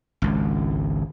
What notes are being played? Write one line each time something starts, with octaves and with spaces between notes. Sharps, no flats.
G#1 C#2